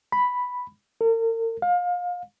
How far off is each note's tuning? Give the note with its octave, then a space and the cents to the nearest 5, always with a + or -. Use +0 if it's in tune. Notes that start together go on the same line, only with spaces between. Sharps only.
B5 +0
A#4 -40
F5 +30